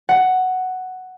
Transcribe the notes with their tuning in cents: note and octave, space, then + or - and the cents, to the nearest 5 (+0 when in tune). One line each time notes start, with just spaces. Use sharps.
F#5 +5